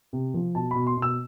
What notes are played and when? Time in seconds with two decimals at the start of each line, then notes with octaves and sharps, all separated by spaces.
0.13 C3
0.34 F3
0.55 B2 A5
0.71 B2 B5
0.87 C6
0.97 B2
1.02 E6